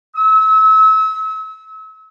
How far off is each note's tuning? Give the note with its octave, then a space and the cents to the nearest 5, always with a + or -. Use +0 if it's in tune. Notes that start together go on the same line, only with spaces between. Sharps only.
E6 -35